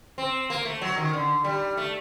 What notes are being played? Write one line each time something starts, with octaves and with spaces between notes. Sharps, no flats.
C4
A#3
A3
F#3
D#3
D3
G3
A3